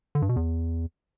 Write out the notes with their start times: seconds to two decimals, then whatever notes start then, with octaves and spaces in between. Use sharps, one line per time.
0.15 D3
0.22 G2
0.29 B2
0.36 E2